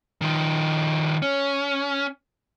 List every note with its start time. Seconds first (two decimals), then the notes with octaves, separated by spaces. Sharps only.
0.21 D#3 F3
1.22 C#4